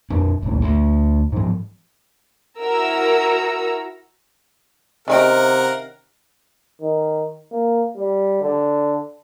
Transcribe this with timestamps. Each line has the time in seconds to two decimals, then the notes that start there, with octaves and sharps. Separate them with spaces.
0.10 F2 D4
0.43 D#1 G#1 D2
0.62 D2
1.32 G#2 F3
2.59 E4 F#4 A#4 A#5 E6
5.08 C3 D#3 C#4 G4 A#4 F5 F#5
6.81 D#3
7.52 A#3
7.97 G3
8.42 D3